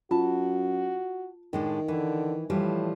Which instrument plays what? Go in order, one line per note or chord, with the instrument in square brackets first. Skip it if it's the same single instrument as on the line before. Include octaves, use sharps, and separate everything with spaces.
[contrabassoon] F#2 [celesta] F4 [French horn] F#4 [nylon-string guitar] A5
[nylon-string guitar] A2 G#3 D4 [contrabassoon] D#3
[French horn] D3 [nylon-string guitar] E3
[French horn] A2 [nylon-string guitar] E3 F3 G3